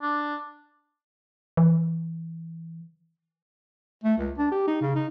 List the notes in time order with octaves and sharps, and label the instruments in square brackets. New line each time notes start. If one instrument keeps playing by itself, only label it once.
[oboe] D4
[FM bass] E3
[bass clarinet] A3
C#2
D4
G4
D#4
C#3
D#4